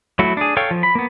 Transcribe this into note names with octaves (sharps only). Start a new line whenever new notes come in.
F#3 A3 E4 F#4
D4 G#4
A4 C#5 F5 G5 C#6
F3
B5
A#3 B3